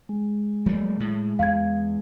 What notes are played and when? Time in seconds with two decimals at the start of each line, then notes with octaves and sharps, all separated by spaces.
0.09 G#3
0.66 F#3 A3 A#3
1.00 A2
1.39 E2 F5 G#6